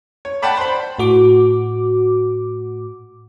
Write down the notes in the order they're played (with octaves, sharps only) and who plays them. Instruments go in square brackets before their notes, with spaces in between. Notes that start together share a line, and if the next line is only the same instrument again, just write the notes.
[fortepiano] C#5
D5 F#5 G5 A5 B5 D6
C5 B5
[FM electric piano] A2 F#4 D6